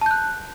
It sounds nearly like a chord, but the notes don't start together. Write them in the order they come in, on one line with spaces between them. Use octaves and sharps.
A5 G6 F#6